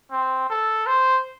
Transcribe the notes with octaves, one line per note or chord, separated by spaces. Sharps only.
C4
A4
C5